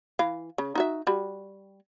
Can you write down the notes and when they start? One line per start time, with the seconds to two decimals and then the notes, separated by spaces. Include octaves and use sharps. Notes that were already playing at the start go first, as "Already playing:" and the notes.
0.19 E3 F5
0.58 C#3
0.75 D#4 F#4 E5
1.07 G3 F#4